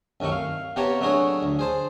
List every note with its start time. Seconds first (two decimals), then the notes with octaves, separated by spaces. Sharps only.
0.20 C2 F#2 D#3 A3 C#6
0.32 F5
0.76 C3 B3 G4 C#5 A5 A#5
1.01 F#3 A3 D4 F#4 G#4 C#5
1.43 D2
1.59 G#4 C5 A5